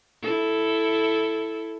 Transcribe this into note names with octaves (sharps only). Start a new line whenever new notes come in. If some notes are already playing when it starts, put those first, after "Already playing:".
E4 A4